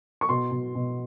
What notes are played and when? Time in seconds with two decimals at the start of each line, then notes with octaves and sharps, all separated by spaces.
0.21 C#6
0.29 B2 C6
0.51 B2
0.75 B2